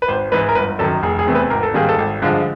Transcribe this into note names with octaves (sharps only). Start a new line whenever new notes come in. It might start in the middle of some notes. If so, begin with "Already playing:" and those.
B4
G#1 C5
G#2 E3 B4
A#4
G1 B4
F#2 D#3 A4
F1 G#4
G#4
E2 C3 E3 A3
B4
G#1 A#4
A4
G#2 D#3 G3 A#3 G#4
A4
G#1
G2 D3 F3 G#3